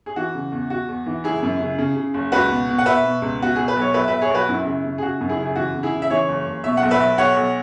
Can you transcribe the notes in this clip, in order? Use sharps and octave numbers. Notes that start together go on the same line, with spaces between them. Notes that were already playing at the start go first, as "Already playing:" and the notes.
G#4
E3 F#4
C#3
E2
E2 F#4
E2
E3
F#1 E4 G#4
F#2
C#3
C#3
C#3
F#1
C#2 F#4 B4
B2
B2
F#5
B2 B4 E5
B2
C#2
B2 F#4
B2 G#4
B4
B1
C#5
B1 B4 E5
B1 B4 E5
G#4 C#5
B1 F#4 B4
F#2 E4
C#3
C#3
G#4
C#3 F#4
F#2
E4 G#4
C#3
G#4
E3 F#4
C#3
E4 G#4
C#3
E5
E3 G#4 C#5
F#1
F#1
B2 E5
F#5
B1
B4 E5
B1
B1 C#5 F#5
B1